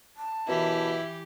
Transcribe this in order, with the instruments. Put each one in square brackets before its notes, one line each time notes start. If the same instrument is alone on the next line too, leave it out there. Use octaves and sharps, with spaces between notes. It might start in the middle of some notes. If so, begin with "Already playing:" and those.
[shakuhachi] A5
[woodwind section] F#2 B2 [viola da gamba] E3 G4 [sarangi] E4